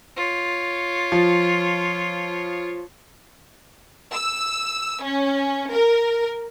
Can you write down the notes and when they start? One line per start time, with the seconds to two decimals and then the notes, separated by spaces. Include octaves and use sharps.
0.16 F4 C#5
1.12 F3
4.11 E6
5.03 C#4
5.71 A#4